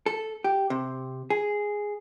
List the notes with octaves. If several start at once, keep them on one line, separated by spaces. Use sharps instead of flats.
A4
G4
C3
G#4